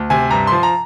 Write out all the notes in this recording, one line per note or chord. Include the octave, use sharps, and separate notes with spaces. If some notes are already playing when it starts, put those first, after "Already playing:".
Already playing: D2
C3 G#5
G2 A#5
F3 C6
A#5